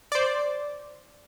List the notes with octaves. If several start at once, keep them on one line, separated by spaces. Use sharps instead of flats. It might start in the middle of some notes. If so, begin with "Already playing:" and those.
C5 D5